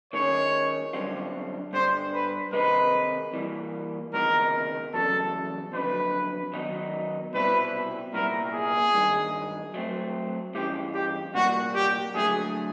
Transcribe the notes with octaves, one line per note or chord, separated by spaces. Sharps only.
D#3 G#3 C#4 C#5
F#2 D3 G3 C4 F4
G2 D3 G3 C5
B4
C3 D#3 G#3 C4 D#4 B4
E3 G3 A#3
C#2 C3 D#3 G#3 B3 A#4
E2 C#3 F#3 A4
F2 D3 F#3 B4
D#3 F#3 B3 D#4
C2 B2 G3 C4 E4 B4
C2 A#2 G3 B3 E4 A#4
G#4
G2 D#3 G#3
F#3 A3 C4
G2 E3 G#3 C#4 F4 G4
G4
C2 A#2 G3 A#3 F#4
G4
D3 F#3 A3 G#4